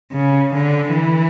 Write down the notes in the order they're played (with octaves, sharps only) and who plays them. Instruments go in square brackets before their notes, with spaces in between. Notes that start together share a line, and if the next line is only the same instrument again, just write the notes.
[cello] C#3
D3
E3